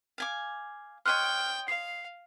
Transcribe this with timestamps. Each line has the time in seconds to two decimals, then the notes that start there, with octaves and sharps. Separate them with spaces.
0.18 F5 G#5 D6
1.06 C#5 D#5 G5 C6 F6 F#6
1.68 F5 C7